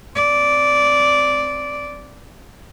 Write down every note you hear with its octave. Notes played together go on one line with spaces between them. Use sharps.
C4 D5